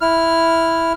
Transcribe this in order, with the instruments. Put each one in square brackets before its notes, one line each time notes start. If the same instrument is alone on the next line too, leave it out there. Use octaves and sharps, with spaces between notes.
[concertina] E4 F6